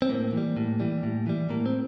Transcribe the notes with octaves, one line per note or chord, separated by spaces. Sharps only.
C4
A2 A#3
E3 G3
A2
E3 G3
A2
E3 G3
A2 A#3
C4